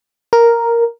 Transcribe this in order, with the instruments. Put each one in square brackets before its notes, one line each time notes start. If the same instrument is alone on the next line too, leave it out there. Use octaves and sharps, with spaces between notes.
[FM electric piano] A#4